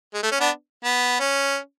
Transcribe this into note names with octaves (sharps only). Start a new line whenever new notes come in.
G#3
A3
C#4
B3 D4
B3
C#4